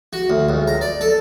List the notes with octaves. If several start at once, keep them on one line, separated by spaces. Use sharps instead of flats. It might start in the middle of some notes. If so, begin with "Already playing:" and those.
F#4
D2
C#2
A#5
D5
A4